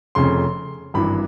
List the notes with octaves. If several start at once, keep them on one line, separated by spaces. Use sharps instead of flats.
F1 F2 C#3 C6
G#1 G2 E3 B5